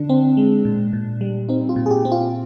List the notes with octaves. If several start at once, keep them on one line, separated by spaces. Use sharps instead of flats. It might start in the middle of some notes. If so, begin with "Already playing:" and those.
Already playing: D3 D4
C4
G#3
A#2
A#2
G3
C4 D#4
F4
A#2
G#4
G4
C4
F4